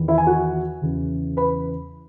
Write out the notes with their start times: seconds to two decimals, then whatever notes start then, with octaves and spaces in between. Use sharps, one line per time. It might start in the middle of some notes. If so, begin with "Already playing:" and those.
Already playing: E2 D#3
0.08 E4 E5
0.18 G#5
0.27 F#4 F#5
0.82 E2 C#3 E3
1.37 B4 B5